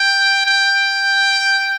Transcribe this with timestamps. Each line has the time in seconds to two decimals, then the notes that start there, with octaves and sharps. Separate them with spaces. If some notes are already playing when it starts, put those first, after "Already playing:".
Already playing: G5
0.46 G5